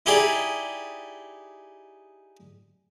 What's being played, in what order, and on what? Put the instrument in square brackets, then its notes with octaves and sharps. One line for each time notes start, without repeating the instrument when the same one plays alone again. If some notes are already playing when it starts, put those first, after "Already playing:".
[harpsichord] D#4 E4 G4 G#4 D5